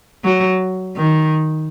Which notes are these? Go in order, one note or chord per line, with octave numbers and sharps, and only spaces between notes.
F#3
D#3